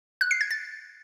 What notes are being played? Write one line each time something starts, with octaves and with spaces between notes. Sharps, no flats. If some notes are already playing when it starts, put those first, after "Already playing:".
F#6
C7
G#6
A6